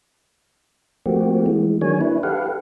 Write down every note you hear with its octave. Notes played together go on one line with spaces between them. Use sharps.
F3 A3 A#3 C4 F#4 G4
E3 G#3
D#3 F#3 A#3 D4 C#5 G#5
D4 E4 B4
G4 A4 B4 F5 F#5